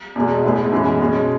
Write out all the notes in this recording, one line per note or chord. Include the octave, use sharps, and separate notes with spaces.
E2 B2 G#3
A2 G#3 B3 E4
F#2 E3 G#3 B3
B2 G#3 C#4